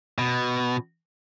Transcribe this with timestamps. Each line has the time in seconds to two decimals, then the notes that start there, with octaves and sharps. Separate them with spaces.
0.18 B2